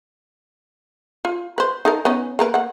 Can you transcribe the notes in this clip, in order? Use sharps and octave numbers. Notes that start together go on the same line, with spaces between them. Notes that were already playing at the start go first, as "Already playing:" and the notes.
F4
B4 C5
D#4 A4 A#4
B3 C#4 D#4
A#3 A#4 B4
A#3 F#5